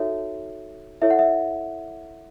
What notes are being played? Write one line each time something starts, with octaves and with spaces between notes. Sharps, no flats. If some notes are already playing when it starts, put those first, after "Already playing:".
Already playing: D#4 F#4 A4 C#5 E5
E4 A4 C#5 E5
F#5
E5